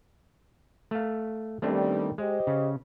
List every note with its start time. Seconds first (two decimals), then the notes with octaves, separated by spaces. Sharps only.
0.91 A3 F5
1.62 D#3 G3 A3 B3 C4 D4
2.18 G#3 G4 C5 D#5
2.47 C#3